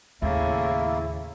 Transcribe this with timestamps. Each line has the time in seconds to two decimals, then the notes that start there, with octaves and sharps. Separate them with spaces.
0.22 D#2 A2 C#3 A#3 E4